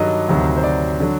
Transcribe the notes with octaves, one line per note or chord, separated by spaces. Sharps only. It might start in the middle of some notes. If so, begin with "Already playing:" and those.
Already playing: G2 D#3 F#3 A4 D#5
D2 C3 D#3 F#3
C5
D5
D3 F#3